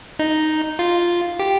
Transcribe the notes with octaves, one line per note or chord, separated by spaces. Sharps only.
D#4
F4
G4